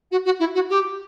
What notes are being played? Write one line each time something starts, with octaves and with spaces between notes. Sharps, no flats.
F#4
F#4
E4
F#4
G4